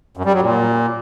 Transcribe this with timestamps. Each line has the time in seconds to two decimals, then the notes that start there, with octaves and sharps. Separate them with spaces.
0.17 F#2
0.25 G3
0.33 F#3
0.41 A#2